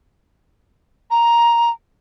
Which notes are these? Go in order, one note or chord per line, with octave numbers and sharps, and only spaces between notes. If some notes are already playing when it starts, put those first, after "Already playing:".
A#5